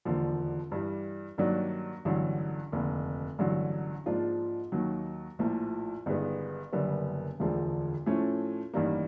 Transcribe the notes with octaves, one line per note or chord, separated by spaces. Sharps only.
E1 D#2 D3 F3
G2 E3 G3
G2 D#3 F#3 A#3 D4
A1 G2 D3 F#3
F1 D#2 D3
A1 G2 D3 F#3
G#2 F3 A#3 D4 F4
D#2 D#3 F#3
A#1 A2 F3 A#3
G1 G2 D#3 G#3 B3
F#1 F#2 D3 G3 B3
E1 D2 D3 F3 G#3
A2 F3 A3 C#4
A1 G2 D#3 G3 A#3